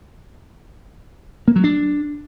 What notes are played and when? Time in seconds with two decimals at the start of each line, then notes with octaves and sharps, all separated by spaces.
1.48 A#3
1.56 F#3
1.64 D4